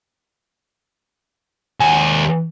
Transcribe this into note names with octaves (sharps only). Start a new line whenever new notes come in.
D#2 G#5